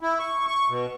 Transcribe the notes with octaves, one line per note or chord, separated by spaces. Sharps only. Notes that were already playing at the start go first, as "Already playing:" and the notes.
E4
C#6
C#6
B2